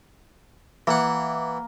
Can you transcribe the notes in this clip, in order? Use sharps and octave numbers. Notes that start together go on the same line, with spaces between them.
E3 A#3 F#5